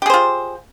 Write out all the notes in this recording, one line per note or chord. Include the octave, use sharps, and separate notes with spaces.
F4 G4 G#4 C5